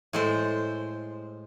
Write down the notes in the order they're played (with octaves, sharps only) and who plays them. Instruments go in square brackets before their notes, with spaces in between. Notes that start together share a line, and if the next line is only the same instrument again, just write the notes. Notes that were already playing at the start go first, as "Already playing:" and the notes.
[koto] A2 G#3 C5